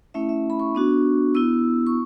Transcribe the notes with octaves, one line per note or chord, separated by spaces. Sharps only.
A3 C#4 E4 E5
E5
B5
C#6
B3 D4 F#4
B3 E4 E6
C#6